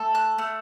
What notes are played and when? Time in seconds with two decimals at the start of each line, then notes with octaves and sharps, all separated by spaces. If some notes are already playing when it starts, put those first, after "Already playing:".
Already playing: A3 A4
0.15 F#6
0.38 A3